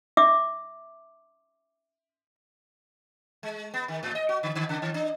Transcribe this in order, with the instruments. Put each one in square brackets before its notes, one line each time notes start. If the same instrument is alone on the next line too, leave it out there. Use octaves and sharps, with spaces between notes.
[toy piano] E5 D6
[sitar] G#3
B3
D#3
A2
D#5
F#4
D3
D3
C#3
D#3
D4